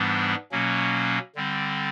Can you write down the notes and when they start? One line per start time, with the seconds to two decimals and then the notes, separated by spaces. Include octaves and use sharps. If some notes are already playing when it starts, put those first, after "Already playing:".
Already playing: G#2 E3 G3 B3 D4
0.51 B2 F#3 A#3 C#4
1.35 D3 G3 C4